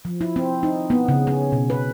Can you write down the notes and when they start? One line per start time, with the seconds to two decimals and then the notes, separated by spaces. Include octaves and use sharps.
0.05 F3
0.21 E4
0.36 C4
0.63 D#4
0.90 B3
1.08 C#3
1.27 C#4
1.52 B2
1.70 B4